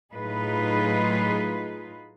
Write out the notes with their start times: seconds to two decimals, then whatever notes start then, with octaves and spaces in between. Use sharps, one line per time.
0.14 A2 F#3 D#4 F4 G#4 B4